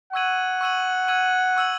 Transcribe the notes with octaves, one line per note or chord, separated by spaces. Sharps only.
F#5 C#6 E6 G#6 D#7 F#7
C#6 E6 G#6 D#7 F#7
C#6 E6 G#6 D#7 F#7
C#6 E6 G#6 D#7 F#7